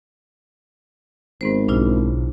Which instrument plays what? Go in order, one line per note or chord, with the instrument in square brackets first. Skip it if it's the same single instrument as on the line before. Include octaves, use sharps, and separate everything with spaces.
[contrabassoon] G#1 [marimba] G#2 B3 C5
[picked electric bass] B1 [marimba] D4 E4 F4